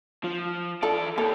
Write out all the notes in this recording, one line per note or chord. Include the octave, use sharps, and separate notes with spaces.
F3
E2 F4 A4 D5
G3 A#3 G4 A4